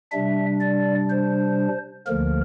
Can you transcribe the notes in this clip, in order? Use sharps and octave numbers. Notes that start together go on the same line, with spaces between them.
C3 G3 D4 E5
D5
C5
D2 D3 F3 A#3 A#4